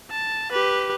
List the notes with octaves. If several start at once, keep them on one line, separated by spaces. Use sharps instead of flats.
A5
G4 B4